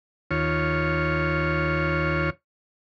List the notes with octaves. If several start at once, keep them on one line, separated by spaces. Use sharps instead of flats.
D#2 F4 C#5